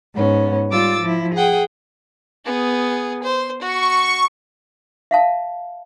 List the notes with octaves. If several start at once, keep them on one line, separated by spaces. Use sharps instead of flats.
G#2 B3 C#4
G3 F4 D6 E6 A6
F3 E4
G#4 F#5 G5
B3 G#4
C5
F#4 C#6
E5 F5 A5